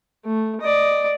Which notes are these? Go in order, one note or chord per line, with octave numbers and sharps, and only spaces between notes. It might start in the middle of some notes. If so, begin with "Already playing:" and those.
A3
D5 D#5